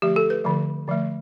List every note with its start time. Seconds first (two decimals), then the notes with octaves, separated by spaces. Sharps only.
0.02 D3 F3 A3 G4
0.16 A4
0.30 B4
0.44 D3 F3 A3
0.87 D3 F3 A3